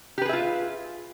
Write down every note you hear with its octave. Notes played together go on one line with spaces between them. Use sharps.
F4 G4 G#4 B4 E5